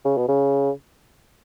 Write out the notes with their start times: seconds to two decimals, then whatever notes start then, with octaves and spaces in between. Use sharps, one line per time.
0.05 C#3
0.17 B2
0.29 C#3